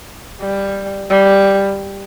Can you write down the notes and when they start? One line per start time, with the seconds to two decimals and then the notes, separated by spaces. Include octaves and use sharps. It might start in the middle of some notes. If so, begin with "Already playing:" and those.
0.41 G3
1.10 G3